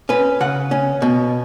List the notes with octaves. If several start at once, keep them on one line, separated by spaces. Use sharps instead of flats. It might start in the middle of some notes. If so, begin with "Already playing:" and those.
C#4 B4
C#3 F#5
C#4
B2